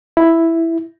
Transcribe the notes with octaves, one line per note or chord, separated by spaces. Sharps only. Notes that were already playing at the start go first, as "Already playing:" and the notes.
E4